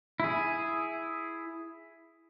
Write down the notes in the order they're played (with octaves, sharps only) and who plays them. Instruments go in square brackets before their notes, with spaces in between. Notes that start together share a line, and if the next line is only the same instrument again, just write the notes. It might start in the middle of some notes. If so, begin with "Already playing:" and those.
[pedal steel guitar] E4 G#4